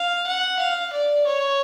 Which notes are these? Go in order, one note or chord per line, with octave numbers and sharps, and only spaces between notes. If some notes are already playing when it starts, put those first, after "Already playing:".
Already playing: F5
F#5
F5
D5
C#5